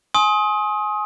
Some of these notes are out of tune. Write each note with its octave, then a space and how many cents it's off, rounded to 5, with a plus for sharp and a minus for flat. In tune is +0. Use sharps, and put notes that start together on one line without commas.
G#5 +20 C6 +35 D#6 +25